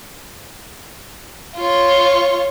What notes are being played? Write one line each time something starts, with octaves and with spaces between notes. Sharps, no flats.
F4 C#5